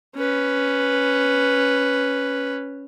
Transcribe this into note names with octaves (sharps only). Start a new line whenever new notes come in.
C#4 B4